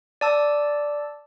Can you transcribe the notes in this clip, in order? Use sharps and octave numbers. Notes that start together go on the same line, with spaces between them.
D5 A5 E6